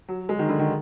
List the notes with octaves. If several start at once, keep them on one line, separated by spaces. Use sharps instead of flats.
F#3
G#3
D#3
D3
D#3